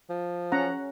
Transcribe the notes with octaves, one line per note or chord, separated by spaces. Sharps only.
F3
C#4 F#5 A#5